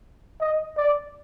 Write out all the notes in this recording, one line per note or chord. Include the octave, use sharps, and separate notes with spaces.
D#5
D5